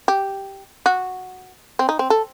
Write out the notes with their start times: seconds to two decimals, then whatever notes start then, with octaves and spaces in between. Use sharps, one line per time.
0.08 G4
0.86 F#4
1.79 C4
1.89 D#4
1.99 C4
2.10 A4